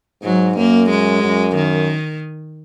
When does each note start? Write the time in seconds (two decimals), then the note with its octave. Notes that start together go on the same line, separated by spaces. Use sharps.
0.23 G#2 F#3
0.57 F#2 A#3
0.90 G#3
1.23 F#2
1.56 D#3